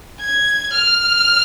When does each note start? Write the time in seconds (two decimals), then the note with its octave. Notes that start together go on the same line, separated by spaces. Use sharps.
0.20 G#6
0.73 F6